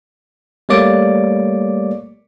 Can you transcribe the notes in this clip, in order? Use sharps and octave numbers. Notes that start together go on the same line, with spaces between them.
G3 A3 A#3 C#5 D5 D6